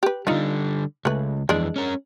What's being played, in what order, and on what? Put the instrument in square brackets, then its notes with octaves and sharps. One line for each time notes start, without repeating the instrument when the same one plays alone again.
[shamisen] G4 B4
[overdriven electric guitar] D3 G3 [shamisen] D#4 F4 F5
[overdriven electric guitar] C#2 [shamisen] A3 B4
[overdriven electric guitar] F2 E3 [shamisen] G#3 D4
[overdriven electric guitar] C#4 A#4